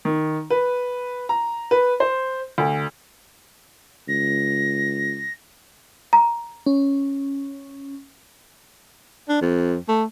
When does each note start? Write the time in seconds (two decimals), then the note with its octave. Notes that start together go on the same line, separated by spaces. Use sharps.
0.05 D#3
0.50 B4
1.29 A#5
1.71 B4
2.00 C5
2.58 D2
4.08 C#2 A#6
6.13 A#5
6.66 C#4
9.29 D4
9.41 F2
9.88 A3